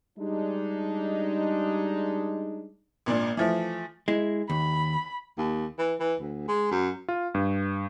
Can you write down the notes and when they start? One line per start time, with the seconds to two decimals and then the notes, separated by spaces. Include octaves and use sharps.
0.18 G3 G#3 D4 D#4
3.06 G#1 A#2 D4
3.37 E3 F3 A3
4.08 G#3 E4
4.50 D#2 B5
5.38 D#2
5.79 E3
6.00 E3
6.20 D2
6.48 G#3
6.71 F#2
7.08 F4
7.35 G2